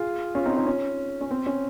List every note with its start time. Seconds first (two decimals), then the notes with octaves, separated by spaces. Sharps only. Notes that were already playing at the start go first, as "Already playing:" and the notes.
Already playing: F4 G#4
0.35 C#4 F4
0.45 C4 D#4
0.52 F4
0.56 C4 D#4
0.67 C#4
1.21 C#4
1.31 C4
1.46 C#4